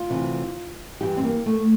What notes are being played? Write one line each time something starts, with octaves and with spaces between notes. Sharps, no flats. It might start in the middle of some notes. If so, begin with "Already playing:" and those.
Already playing: F4
D2 C3 E3
G2 E3 G4
C4
A#3
A3